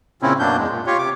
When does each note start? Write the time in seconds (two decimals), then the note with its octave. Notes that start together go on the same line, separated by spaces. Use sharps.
0.22 A#2 C#3 C4 C#4 E4
0.39 F#2 B2 F#3 A#3 D4 G6
0.58 E2 G#3
0.70 A#2
0.87 F4 G4 C#5
0.98 C3 D6